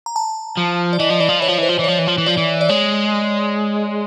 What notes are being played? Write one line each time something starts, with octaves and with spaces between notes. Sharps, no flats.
A#5
A5
F3
D5
E3 D#5
F3
E3 D5
F3
E3 C#5
F3
E3 C5
F3
E3
F3 C#5
E3
F3
E3
F3 D5
E3
D5
G#3 C#5